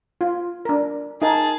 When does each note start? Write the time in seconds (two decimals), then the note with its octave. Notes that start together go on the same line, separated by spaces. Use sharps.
0.21 F4
0.65 D4 A#4
1.22 D#4 G#4 A#4 A5